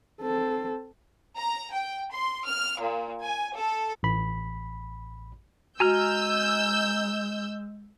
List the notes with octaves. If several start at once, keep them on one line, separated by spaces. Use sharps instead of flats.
C4 A4
A#5
G5
C6
F6
A#2
G#5
A4
A1 B5
G#3 F#4 G#5 A#5 E6 F6 G6